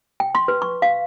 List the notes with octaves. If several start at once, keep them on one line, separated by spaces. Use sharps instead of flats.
G5
C6
B4
C#6
F5